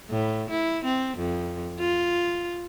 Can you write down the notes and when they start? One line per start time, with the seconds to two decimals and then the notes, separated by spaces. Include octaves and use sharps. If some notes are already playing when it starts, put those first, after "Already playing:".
0.10 A2
0.50 E4
0.84 C4
1.17 F2
1.79 F4